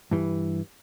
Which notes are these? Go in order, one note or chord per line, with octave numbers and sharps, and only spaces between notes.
G2 E3